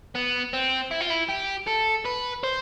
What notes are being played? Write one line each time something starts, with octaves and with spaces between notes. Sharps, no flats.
B3
C4
E4
F4
E4
G4
A4
B4
C5